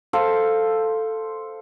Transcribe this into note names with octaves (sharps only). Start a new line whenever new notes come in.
A4 C5 F5